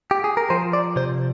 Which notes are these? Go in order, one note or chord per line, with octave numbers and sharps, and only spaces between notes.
G4
G#4
A#4
F3 C5
D5
C3 C5